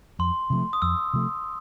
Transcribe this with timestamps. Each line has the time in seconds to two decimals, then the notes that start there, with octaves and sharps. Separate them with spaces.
0.19 F2 C6
0.50 C3 F3 A3
0.73 D#6
0.82 F2 E6
1.13 C3 F3 A3